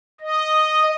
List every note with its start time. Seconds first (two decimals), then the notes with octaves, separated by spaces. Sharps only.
0.20 D#5